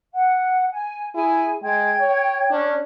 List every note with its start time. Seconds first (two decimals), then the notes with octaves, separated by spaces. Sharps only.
0.12 F#5
0.72 G#5
1.15 E4 G#4 G#5
1.63 G#3 G5 G#6
2.00 C#5
2.50 C#4 D4